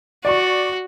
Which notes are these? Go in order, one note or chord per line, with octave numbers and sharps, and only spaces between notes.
F#4 D5 C#6